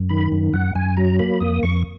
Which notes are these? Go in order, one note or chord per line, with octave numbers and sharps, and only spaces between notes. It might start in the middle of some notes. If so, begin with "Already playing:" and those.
Already playing: F#2
D#3 B5
F#2
F#2 F#5
F#2 G#5
F#3 A#5
A#3 B5
F2 D#6
F2 C#6